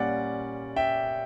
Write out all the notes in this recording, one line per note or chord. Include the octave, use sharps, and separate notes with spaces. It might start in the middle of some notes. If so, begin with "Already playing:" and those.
Already playing: A#2 G3 A#3 C#4 D5 F#5
E5 G5